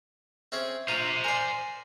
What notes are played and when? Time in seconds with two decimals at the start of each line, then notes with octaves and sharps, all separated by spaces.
0.52 C4 C#4 G#4 E5
0.88 F4 C5 A#5 D#7 E7
1.24 A#4 D5 G#5 C6